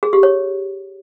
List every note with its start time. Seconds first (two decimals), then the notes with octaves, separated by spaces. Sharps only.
0.03 G#4
0.13 G4
0.23 C#5